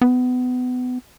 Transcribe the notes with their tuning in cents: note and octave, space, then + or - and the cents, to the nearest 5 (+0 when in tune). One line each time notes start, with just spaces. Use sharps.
B3 +25